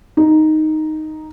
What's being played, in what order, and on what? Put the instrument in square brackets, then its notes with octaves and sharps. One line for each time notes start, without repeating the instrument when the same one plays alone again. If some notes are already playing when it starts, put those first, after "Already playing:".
[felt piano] D#4